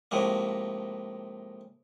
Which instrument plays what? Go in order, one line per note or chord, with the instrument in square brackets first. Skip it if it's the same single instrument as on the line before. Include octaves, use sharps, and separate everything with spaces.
[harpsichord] A2 C3 F3 G#3 A#3